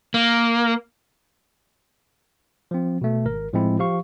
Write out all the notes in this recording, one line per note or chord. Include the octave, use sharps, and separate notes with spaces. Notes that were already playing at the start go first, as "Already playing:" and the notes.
A#3
F3 C4
B2 A3
G#1 A#4
A2 F3 G#3 C4 E4
F3 G4 F5 C#6